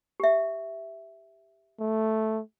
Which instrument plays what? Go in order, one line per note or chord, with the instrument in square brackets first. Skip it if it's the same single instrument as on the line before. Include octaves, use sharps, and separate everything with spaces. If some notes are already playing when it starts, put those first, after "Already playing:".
[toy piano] G4 E5
[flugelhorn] A3